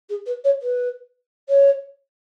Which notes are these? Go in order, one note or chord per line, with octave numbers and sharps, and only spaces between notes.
G#4
B4
C#5
B4
C#5